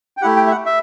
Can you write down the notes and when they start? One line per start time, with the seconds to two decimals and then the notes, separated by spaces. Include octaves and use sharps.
0.17 G5
0.22 A3 E4 G4 F#5
0.36 G5
0.47 E5
0.51 F#5
0.66 E5